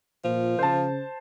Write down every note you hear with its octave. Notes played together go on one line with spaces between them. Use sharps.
A#2 F3
C#3 C5 A5